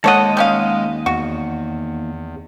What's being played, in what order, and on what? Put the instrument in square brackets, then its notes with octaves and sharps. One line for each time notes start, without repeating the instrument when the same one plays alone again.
[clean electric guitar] D#2 D#5 [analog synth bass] G#3 [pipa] A4 C#5 F#5
[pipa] G3 C#4 F5
[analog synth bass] E2 [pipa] F#4